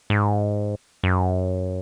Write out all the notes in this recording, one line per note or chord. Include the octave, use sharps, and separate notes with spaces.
G#2
F#2